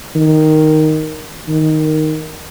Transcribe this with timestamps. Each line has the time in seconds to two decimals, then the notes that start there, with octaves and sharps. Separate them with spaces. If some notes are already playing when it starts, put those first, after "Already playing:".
0.16 D#3
1.48 D#3